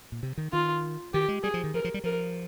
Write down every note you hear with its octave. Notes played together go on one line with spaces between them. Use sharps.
A#2
C3
D#3
D#3 F4
D#3 G4
G#3
G3 G#4
F3
D#3
F3 A#4
F3
G3
F3 A#4